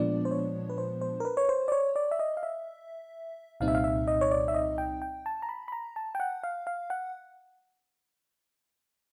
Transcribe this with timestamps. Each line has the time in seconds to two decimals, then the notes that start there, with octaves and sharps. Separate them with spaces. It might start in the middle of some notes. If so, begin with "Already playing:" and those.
Already playing: A#2 F3 G#3 B3 D4 D5
0.25 C5
0.31 C#5
0.69 B4
0.78 C5
1.01 C5
1.20 A#4
1.25 B4
1.37 C#5
1.49 C5
1.68 D5
1.72 C#5
1.96 D5
2.11 E5
2.19 D#5
2.37 F5
2.43 E5
3.60 C2 A#2 G3 C4 D#4 F5
3.68 E5
3.75 F5
3.84 E5
4.08 D#5
4.21 C#5
4.31 D5
4.48 E5
4.54 D#5
4.78 G5
5.02 G5
5.26 A5
5.42 A#5
5.49 B5
5.68 B5
5.72 A#5
5.96 A5
6.15 G5
6.20 F#5
6.43 F5
6.67 F5
6.90 F#5